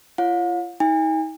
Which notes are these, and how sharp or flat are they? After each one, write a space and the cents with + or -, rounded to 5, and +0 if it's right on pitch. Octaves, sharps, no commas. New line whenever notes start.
F4 -35 C#5 +0 F5 +45
D#4 +40 G#5 -40